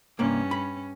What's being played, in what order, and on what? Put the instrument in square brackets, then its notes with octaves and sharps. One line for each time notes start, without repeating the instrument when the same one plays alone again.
[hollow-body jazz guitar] C2 A#3 [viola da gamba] G2 C#4
[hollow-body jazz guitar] B5